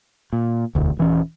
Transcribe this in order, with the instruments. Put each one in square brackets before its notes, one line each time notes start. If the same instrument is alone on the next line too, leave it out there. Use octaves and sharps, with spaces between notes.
[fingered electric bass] A#2
E1 D2
D#1 E3 C#4